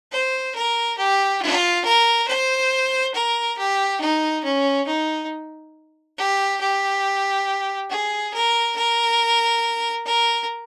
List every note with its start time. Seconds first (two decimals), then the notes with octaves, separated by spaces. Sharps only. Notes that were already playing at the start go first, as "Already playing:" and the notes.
0.12 C5
0.55 A#4
0.98 G4
1.42 F4
1.85 A#4
2.28 C5
3.15 A#4
3.58 G4
4.01 D#4
4.44 C#4
4.87 D#4
6.17 G4
6.61 G4
7.90 G#4
8.34 A#4
8.76 A#4
10.06 A#4